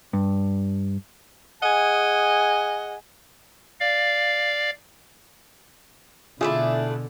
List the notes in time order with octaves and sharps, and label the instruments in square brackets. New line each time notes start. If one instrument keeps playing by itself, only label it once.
[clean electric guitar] G2
[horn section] G#4 D#5 F#5 G#5
[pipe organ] D5 F5
[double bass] B2 D3 [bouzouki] A3 D4 E4 [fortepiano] F4 G#4